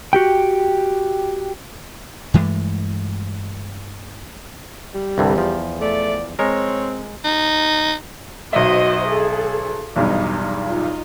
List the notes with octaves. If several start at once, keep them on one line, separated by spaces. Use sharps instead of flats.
F#4 G4 G5
G2 E3 G#3 A3
G3
C2 G2 D3
E2 F3
A3 D5
G#3 C4 A#4 C#5
D#4
B1 F#4 C5 D#5 E5
G#4 A4
B1 E2 G2 D#4
D#4 F4